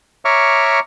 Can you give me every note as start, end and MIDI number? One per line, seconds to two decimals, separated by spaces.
0.25 0.80 73
0.25 0.80 76
0.25 0.80 82
0.25 0.80 85
0.25 0.80 86
0.25 0.80 89